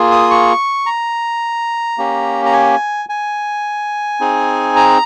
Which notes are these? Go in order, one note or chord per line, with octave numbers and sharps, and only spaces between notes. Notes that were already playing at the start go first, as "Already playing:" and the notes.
Already playing: A#3 F4 G#4
D#6
C#6
A#5
A#3 C#4 G4
A#5
G#5
G#5
C4 D#4 G#4
A#5